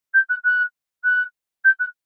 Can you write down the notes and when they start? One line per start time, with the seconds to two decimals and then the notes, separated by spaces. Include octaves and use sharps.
0.14 G6
0.29 F#6
0.44 F#6
1.04 F#6
1.64 G6
1.79 F#6